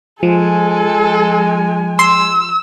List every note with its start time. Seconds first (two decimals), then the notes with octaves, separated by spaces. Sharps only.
0.23 F3 G#3 A4 G#5
1.99 C6 E6